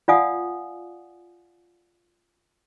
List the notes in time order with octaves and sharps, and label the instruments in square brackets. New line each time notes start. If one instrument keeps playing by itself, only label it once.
[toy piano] F4 D5 F5 F#5 G#5 D#6